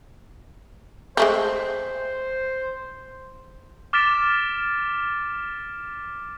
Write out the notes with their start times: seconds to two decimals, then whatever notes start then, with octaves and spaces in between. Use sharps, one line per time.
1.17 G#3 A3 C4 C5
3.93 D6 F6 A6 B6 D7 E7